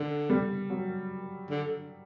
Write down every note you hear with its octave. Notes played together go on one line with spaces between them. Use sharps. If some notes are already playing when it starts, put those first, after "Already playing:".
Already playing: D3
G3
F#3
D3